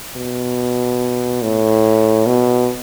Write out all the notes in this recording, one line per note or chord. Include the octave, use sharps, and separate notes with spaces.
B2
A2
B2